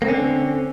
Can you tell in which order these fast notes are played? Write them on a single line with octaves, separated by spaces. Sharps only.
A#3 C4 C#4 D3